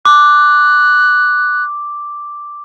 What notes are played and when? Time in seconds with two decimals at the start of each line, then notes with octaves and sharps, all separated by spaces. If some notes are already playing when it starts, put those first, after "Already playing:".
0.05 D6 F#6